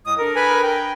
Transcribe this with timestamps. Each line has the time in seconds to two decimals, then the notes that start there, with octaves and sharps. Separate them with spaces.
0.06 A2 G#3 D#6
0.19 D4 A4 A#4
0.36 B4 G#5 B5
0.63 G5